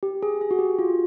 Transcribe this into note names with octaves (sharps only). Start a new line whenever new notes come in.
G4
G#4
G#4
F#4
G4
F4